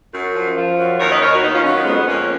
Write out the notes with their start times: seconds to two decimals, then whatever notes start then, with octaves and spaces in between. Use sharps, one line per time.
0.13 F#2
0.34 F3
0.56 F3
0.77 F#2
0.99 D#2 A#4 C#5
1.09 B4 D#5
1.20 D#2 A#4 C#5
1.31 D#4 F#4
1.42 D#3 B3 D#4
1.53 C#4 F4
1.63 F#3 C#4 F4
1.74 B3 D#4
1.85 F2 G#3 B3
2.06 F2 A#3 C#4